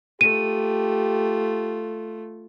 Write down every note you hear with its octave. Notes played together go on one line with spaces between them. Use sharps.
A3 F4 G4 D#7